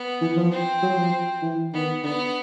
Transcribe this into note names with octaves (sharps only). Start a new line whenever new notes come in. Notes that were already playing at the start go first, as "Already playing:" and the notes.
Already playing: B3
E3
F3
C4
F#3
F3
E3
D#3 B3
D3 B3